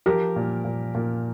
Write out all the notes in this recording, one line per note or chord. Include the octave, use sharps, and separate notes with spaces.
F3 G4 A#4
A#2
A#2
A#2